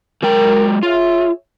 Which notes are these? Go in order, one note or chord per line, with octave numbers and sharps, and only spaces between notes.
F#3 G#3 A#4 G5
F4 G#4 C#5 E5